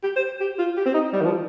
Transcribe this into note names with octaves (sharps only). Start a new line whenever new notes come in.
G4
C5
G4
F4
G4
C4
D#4
G3
D#3
F3